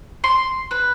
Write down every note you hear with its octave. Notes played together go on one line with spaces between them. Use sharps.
C6
B4